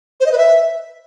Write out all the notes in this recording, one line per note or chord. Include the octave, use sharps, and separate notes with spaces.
C5
D#5
B4
E5